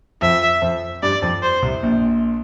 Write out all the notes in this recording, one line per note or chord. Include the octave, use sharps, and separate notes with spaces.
F2 F3 E5
F2 F3
G2 G3 D5
F2 F3
C5
C2 C3
A#1 A#2